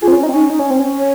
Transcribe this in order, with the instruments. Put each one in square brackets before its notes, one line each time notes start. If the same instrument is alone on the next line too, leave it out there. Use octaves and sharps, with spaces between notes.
[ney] F4 [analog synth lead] G#4
[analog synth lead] C4
C#4
D#4
C4
[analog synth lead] C#4 [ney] D#4
[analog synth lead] D#4
C#4
C4
C#4
[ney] C#5